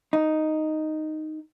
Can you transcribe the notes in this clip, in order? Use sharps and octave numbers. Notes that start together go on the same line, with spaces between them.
D#4